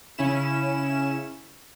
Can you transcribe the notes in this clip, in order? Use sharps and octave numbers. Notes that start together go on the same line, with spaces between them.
C#3 C#4 E4 E7